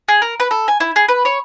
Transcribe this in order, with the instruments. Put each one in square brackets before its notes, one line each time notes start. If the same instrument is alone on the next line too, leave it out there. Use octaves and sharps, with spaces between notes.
[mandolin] G#4
A#4
B4
A4
G#5
E4
G#4
B4
C#5